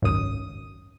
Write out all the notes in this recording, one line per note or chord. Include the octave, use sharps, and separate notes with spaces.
G#1 C#2 F#2 D#6